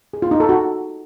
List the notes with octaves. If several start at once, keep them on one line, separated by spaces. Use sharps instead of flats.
G#4
F4
D#4
A4
F#4